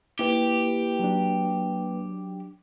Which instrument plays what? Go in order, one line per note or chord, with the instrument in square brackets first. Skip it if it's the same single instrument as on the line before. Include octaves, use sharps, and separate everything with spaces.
[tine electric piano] A#3 B4 [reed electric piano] E4 [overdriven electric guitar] G4
[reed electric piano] F#3 D4